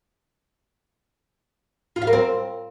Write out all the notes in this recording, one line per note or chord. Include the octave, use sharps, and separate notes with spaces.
F4
F5
A#4
C4